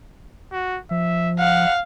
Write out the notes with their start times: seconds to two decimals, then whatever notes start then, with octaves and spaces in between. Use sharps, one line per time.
0.52 F#4
0.91 F3 E5
1.39 F5 F#5